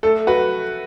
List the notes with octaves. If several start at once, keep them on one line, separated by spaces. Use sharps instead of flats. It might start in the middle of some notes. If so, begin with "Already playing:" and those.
A3 A4
F#4 B4